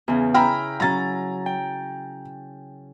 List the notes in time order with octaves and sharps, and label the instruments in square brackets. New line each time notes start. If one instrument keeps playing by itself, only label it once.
[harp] E2 C#3
[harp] E4 F6 [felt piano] G5 A#5 B5
[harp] F#3 C#4 [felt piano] A#5 A6
[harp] G5